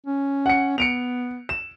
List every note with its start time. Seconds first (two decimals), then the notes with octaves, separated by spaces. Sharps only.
0.06 C#4
0.46 F#5 C#7
0.78 B3 C#7 D7 F7
1.49 E7